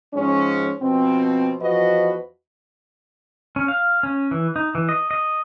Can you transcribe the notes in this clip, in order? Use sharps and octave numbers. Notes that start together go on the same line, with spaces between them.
G#2 F3 G#3 C#4
B2 F3 C4
E2 F3 F#4 B4 D#5
C#4
F5
C#4
E3
D#4
E3
D#5
D#5